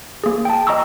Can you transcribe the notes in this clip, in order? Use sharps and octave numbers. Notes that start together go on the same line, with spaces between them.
A#3 G#4
G5 A5
D#5 G5 A#5 C#6 D#6 E6